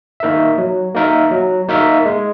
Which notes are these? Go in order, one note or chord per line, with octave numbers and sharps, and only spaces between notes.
A#3 D#4 A#4 E5
F#3
A#3 D#4 A#4 E5
F#3
A#3 D#4 A#4 E5
G#3